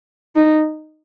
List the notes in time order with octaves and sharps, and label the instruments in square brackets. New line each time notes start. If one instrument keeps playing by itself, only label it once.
[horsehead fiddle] D#4